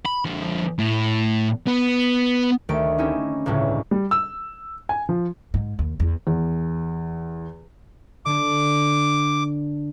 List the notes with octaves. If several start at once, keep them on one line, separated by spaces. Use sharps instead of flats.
B5
D3 F3
A2
B3
D2 D#3 A3 G4 D7
C4 C#4 D#4 E4 G4
G1 C#2 A2 C#3 G3
G3
E6
G#5
F3
G#2
D#2
E2
E2
D3 D4 D6